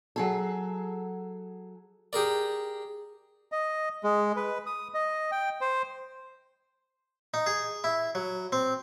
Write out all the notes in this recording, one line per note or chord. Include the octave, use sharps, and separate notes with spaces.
F#3 G#4 A4
G4 G#4 A#4 D5
D#5
G#3
B4
D#6
D#5
G5
C5
D#4
G#4
E4
F#3
C4